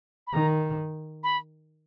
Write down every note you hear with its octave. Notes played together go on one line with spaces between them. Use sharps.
B5
D#3 A#5
B5